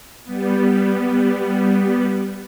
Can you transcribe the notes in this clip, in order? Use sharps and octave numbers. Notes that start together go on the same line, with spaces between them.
G3 B3